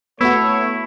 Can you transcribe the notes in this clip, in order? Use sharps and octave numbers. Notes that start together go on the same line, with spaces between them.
A3 B3 E4 F#4 C#5